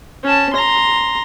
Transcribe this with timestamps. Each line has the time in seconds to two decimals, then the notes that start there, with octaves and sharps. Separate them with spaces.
0.23 C#4 A5
0.53 A#5 C6